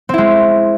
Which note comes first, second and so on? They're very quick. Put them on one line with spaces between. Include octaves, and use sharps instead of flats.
C4 E4 G#3